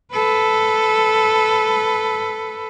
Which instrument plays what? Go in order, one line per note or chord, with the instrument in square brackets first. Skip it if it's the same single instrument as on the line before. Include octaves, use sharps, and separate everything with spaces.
[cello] A4 B4